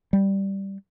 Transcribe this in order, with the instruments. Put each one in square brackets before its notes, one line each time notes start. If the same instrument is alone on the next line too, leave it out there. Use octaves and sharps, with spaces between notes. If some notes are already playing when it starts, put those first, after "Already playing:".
[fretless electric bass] G3